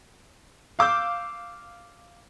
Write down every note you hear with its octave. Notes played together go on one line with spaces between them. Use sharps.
F5 D6 E6 G6